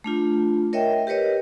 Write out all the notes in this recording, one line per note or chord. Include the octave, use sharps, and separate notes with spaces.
A3 D4 F4
A#4 C#5 D#5 E5 G5
G4 A#4 B4 C#5 D#5